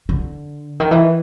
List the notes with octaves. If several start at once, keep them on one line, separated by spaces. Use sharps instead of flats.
D3
D#3
E3